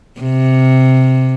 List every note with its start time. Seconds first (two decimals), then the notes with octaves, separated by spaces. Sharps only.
0.20 C3